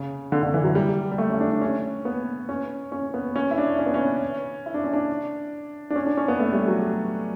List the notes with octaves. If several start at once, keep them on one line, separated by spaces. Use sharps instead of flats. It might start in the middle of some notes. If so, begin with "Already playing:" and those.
Already playing: C#3
D3
D3
E3
F#3
G3
G3
A3
C#4
D4
D4
C#4
B3
C#4
C#4
B3
C#4
E4
D4
C#4
B3
C#4
E4
D4
C#4
D4
D4
C#4
D4
C#4
B3
A3
G3
F#3